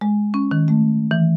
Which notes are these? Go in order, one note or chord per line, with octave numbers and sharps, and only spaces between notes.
G#3
C#4
D#3
A3
E3